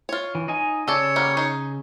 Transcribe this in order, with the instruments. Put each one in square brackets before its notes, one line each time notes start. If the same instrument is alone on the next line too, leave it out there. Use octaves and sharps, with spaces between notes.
[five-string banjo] F4 C#5
[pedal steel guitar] E3
D#4 D#5 G#5
[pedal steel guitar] C#3 E6 [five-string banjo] A4 D5 A5 [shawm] C#5
[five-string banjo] G3 A#3 F#4
D#4 G#4